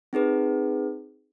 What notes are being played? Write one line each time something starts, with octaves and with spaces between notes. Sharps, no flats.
C4 D#4 G#4 B4